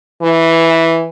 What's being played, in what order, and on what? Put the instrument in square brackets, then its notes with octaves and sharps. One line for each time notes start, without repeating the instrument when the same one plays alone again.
[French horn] E3